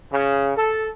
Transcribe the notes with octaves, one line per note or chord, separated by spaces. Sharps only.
C#3
A4